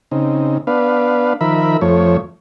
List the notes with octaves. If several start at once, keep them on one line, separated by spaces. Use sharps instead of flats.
C#3 C4 D#4
B3 D4 B4 F5
D#3 F3 A#4 E5 B5
F2 F3 A3 C#5